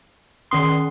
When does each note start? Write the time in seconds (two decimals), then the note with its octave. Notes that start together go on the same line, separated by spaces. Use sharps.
0.51 D#3 C#4 C6 D#6